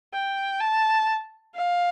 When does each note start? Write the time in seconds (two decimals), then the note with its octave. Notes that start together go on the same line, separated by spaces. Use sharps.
0.14 G5
0.61 A5
1.55 F5